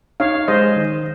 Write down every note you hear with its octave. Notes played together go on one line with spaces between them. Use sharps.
D#4 C#5 F5
G#3 C5 D#5
D#3